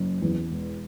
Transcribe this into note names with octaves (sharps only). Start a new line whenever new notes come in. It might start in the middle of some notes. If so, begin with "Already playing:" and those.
Already playing: F#1
E2
E1